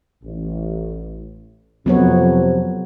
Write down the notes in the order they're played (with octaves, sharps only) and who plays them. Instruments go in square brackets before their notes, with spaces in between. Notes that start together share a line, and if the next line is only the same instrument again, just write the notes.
[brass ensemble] A1
[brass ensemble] F2 C3 [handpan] F#3 B3 C#5